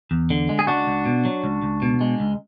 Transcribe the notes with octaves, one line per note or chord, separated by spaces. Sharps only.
E2
D3
G#3
G#4
C#2 D4 F#4
C#2
B2
F#3
C#2
C#2
B2
G#3
C#2